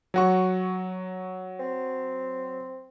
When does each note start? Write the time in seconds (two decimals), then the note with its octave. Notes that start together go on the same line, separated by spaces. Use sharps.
0.14 F#3 F#4 C#6
1.59 C4